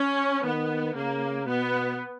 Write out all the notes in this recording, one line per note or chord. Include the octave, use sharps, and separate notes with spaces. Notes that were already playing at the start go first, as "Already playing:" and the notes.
Already playing: C#4
D#3 B3
C#3 A#3
B2 B3